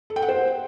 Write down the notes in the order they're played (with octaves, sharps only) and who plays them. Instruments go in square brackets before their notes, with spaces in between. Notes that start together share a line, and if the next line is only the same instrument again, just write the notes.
[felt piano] A4
G5
F#5
C5